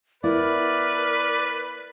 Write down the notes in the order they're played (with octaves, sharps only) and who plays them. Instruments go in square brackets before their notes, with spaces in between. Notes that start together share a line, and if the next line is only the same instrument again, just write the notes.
[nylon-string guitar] B3 E4 [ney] A#4 [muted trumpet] B4 [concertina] D5